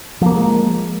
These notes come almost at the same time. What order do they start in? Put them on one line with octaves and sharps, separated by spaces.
F3 A#3 F#3 G#3